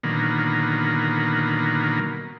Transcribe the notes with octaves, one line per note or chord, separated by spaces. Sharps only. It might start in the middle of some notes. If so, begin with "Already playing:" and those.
A#2 D3 D#3 F#3 A#3 B3